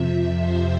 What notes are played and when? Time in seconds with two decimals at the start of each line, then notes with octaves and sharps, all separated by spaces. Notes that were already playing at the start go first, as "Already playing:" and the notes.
Already playing: F2 C3 F3 E5
0.34 C5